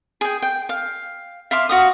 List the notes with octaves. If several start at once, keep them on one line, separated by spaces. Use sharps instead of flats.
G#4 G5
G5
F5
E5 F5 C6 D6
F#4 F5 D#6